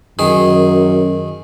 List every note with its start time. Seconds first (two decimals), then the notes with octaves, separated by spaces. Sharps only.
0.19 F#2 D#3 G#4